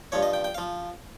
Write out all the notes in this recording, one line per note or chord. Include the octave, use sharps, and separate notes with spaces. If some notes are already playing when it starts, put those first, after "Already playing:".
G2 F3 C#5
D#5
G5
G5
F5
F3